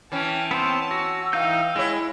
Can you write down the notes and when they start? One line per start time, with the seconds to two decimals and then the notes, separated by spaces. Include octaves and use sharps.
0.12 E3 C#4 G5 A5
0.51 B3 C4 C5 G5
0.91 F#4 E6
1.33 E3 D#4 F5 G5 G6
1.76 G#3 E4 C#5